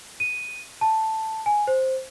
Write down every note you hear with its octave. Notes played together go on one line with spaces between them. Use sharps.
D#7
A5
G#5
C5